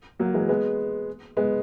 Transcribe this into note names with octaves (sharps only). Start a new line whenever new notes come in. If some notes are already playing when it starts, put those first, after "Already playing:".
F#3 A#3
E3 G#3
G#3 B3
G#3 B3